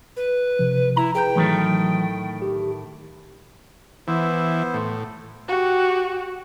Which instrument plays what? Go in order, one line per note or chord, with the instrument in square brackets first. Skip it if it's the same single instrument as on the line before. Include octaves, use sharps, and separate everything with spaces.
[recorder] B4
[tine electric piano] C3 F3
[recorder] E4 [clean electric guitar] A#5
[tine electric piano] G#4 B4 G6 [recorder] G5
[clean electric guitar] A2 D#3 A3 [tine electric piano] E3 F#3
[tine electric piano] G4
[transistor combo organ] E3 [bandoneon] B3 E4 C5
[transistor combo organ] A2
[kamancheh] F#4 G4